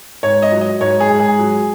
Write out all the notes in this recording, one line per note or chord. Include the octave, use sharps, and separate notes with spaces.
G#2 C#5
D#5
F#3
D#5
G#2 C#5
G#4
G#2
G#4
F#3